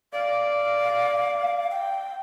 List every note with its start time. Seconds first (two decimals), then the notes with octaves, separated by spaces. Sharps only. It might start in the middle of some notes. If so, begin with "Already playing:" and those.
0.13 D5 F5
1.71 G5